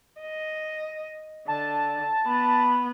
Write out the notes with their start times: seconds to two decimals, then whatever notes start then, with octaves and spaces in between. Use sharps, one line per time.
0.22 D#5
1.48 D3 A5
2.27 B3 B5